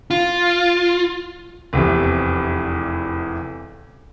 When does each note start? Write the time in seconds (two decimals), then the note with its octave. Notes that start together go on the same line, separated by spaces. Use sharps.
0.11 F4
1.73 F1 E2 C3